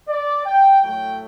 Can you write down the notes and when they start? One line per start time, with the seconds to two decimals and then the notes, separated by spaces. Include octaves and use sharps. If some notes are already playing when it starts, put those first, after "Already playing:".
0.08 D5
0.46 G5
0.82 A2 F#3 A3 G5